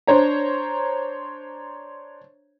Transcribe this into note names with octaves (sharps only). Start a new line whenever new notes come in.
D4 C5 C#5 A#5